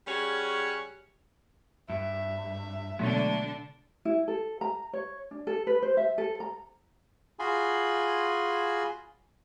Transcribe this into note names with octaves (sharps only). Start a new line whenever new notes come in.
G3 C#4 F#4 G#4 C#5
G2 E5
B2 D3 F#3 G#3 A3 B3 D4
E4
A4
A#5
C#5
D4
A4
B4
C5
E5
A4
A#5
F4 F#4 G#4 G#5 B5 C6